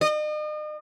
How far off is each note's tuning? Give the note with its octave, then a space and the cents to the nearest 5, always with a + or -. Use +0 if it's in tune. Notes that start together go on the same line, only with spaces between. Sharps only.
D#5 -40